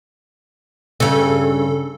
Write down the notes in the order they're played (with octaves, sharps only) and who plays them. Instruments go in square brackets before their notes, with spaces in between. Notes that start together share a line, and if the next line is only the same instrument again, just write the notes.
[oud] G2 C#3 [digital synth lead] A4